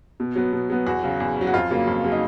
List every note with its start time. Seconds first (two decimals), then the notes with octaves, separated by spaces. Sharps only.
0.20 B2
0.36 F#3 B3
0.53 B2
0.70 F#3 B3
0.86 E2 F#4
1.03 C#3 F#3
1.20 E2
1.37 C#3 F#3
1.47 F#4
1.53 F2 F4
1.71 C#3 F#3 A#3
1.87 F2
2.04 C#3 F#3 A#3
2.12 D#4